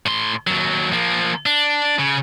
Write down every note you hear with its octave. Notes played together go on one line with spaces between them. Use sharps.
A2 C6
D#2 F#3
F3 A#3
D4
C#3